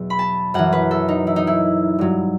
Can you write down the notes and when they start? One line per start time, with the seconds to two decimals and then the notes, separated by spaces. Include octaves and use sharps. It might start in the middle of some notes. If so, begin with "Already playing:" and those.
Already playing: E2 B2 F#3
0.10 B5
0.19 A5
0.54 F#2 E3 F#5
0.73 B4
0.91 A4
1.09 D#4
1.27 E4
1.36 D#4
1.47 E4
1.99 G2 F#3